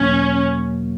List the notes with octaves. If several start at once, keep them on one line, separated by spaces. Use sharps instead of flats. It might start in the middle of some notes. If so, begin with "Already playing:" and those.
Already playing: E2 B2 F#3 A#3 C#4